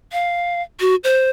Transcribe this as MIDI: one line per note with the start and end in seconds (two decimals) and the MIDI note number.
0.12 0.62 77
0.80 0.95 66
1.04 1.30 72